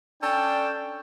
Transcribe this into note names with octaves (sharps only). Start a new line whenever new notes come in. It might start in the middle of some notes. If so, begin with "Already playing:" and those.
C#4 D4 A4 D5 G5 A5